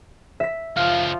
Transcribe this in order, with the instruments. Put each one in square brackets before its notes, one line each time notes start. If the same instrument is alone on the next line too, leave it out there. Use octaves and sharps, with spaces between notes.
[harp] E5 B6
[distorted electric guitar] C#2 F#2 [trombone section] F3 F4 [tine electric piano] F5